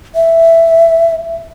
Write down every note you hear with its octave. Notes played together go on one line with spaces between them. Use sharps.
E5